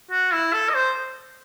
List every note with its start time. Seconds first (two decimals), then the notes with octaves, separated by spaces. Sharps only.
0.11 F#4
0.32 E4
0.53 A4
0.70 D#5
0.74 C5